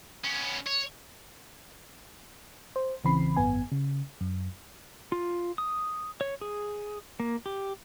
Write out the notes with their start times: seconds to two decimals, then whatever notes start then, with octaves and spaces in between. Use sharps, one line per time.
0.24 B3 C#4
0.67 C#5
2.76 C5
3.04 A1 C#3 E3 C4 B5 C7
3.37 G#1 F#2 B3 G#5
3.72 C#3
4.21 F#2
5.12 F4
5.58 D#6
6.21 C#5
6.41 G#4
7.20 A#3
7.46 G4